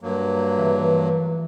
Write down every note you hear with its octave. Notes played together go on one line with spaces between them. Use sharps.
G2 F#3 A#3
E3 F3 A3